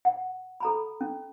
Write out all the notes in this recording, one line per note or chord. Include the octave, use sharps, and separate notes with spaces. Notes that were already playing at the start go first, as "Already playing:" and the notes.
F#5
A4 A#5 B5
C#4